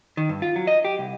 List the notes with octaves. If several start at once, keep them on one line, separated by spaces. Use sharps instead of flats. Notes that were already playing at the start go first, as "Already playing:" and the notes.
D#3
G2
F4
F#3
D#5
G4
C2